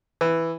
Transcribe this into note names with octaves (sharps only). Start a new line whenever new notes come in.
E3